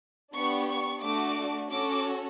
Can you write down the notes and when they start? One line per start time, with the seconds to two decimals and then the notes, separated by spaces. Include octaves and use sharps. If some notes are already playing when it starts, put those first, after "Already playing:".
0.33 B3 D4 G4 C#6
0.67 C#6
1.01 A3 D4 F#4 D6
1.70 C#4 F#4 A4 D6